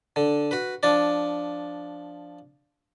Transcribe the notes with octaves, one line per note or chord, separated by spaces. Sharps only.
D3
F#4 B4
F3 D4 D5